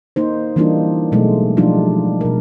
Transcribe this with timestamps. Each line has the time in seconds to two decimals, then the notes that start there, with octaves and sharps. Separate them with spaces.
0.16 A#3 D#4 C5
0.56 E3 G3 A#3 D4 D#4 F4
1.12 B2 F#3 G#3 A3
1.57 F3 G3 D4 D#4 F4
2.21 B2 A#4